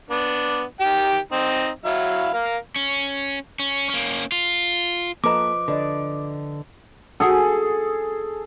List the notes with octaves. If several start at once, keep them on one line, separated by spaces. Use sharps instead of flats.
B3 D4
D#3 G4 G5
C4 D#4
F#3 E4 F5
A#4 F5
C#4
C#4
A#3 C#4
F4
F3 A#3 A4 B4 D#5 A#5 D6
D3 B4 D5 D#5
G#4 A4